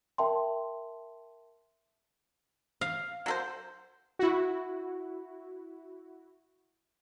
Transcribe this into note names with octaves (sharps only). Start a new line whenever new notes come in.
A#4 E5 G5 A5 C6
F5
F#3 A4 C5
E4 F#4